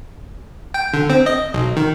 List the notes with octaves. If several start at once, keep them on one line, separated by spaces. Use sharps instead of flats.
G5
D3
C4
D#5
B1
D#3